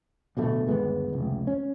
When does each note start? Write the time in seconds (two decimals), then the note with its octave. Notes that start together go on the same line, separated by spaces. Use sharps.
0.37 D1 D2 B2 A3
0.67 G1 D#2 G#3 B3
1.13 F1 C#2
1.47 C#4